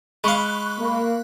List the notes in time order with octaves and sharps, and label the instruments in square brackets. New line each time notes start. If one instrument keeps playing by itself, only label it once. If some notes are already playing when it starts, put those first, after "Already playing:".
[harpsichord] G#3 F5 [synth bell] B5 C#6 F#6
[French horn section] A#3